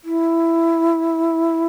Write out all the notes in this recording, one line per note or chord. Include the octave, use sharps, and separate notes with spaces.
E4